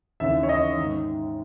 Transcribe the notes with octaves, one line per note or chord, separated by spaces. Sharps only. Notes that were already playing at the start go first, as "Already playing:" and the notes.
D#2 C#3 E3 E5
C#5
D#5
G#2 D#3